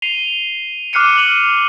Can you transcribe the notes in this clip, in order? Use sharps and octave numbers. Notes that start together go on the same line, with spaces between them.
C7 D#7 F7 G7
D6 F6 F#6 C7 C#7 D#7
C#7 D#7 F7 F#7